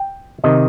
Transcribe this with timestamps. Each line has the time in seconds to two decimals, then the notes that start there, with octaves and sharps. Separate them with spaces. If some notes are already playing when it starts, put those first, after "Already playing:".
Already playing: G5
0.44 C3 D#3 D#5